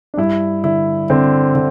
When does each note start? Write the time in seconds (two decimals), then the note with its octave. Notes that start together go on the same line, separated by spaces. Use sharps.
0.14 D4
0.18 G2 E4
0.64 D3 E4
1.10 D3 C4
1.55 D3